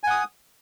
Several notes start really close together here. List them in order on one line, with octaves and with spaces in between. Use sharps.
G#5 F#5 D#6